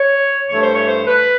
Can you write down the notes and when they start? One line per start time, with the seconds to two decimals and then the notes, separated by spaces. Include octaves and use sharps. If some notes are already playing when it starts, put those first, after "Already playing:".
Already playing: C#5
0.48 G2 E3 A3 C#5
0.61 C5
0.73 C#5
0.86 C5
1.06 B4